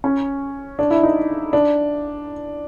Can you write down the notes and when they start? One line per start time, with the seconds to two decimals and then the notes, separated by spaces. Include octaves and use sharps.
0.04 C#4
0.79 D4
0.91 E4
1.03 D#4
1.53 D4